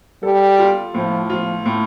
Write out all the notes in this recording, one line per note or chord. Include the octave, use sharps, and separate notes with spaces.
G3 A4
F4
A2 F3
F3 F4
A2